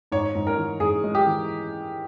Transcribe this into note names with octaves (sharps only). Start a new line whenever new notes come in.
G#2 C#5
G#2
A#4
E3
G#2 G#4
G#3
G4
E3